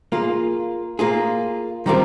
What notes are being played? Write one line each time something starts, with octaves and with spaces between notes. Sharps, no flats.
A#3 F4 G#4
A#3 F4 G#4
D#3 G3 C4 F4 A#4